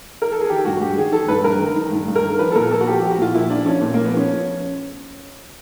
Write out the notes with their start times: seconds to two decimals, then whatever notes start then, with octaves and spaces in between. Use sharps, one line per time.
0.22 A#4
0.32 A4
0.40 G#4
0.49 D#3 G4
0.65 G2 F#4
0.81 G2 G4
0.97 D#3 G#4
1.13 D#3 A4
1.28 G2 B4
1.44 G2 A#4
1.60 D#3
1.76 D#3
1.92 G2
2.08 G2
2.16 A#4
2.24 D#3
2.39 F3 B4
2.51 A4
2.55 A#2 A#4
2.71 A#2 A4
2.81 F#4
2.87 F3 G4
3.00 F3 G4
3.11 F#4
3.18 A#2 F4
3.34 A#2 E4
3.50 F3 D4
3.65 F3 C#4
3.81 A#2
3.94 A#3
3.97 A#2
4.05 B3
4.14 F3 C#4